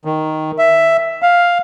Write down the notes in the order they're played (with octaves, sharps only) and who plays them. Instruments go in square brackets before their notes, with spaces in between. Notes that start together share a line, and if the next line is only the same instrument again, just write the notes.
[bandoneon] D#3
E5
F5